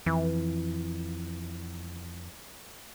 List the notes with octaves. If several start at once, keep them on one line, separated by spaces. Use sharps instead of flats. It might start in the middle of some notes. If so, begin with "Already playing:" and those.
F2 E3